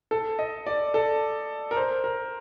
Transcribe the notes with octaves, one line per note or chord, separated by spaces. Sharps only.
A4
D#5
D5
A4
A#4
C5
A#4